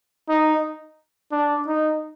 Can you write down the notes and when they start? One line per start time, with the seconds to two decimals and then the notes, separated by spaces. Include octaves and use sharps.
0.29 D#4
1.32 D4
1.67 D#4